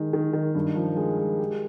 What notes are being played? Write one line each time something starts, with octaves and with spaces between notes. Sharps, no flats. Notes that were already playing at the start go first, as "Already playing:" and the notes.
Already playing: D#3 G#3
D#3
D#3
G2
F3
G#3
G#3
G4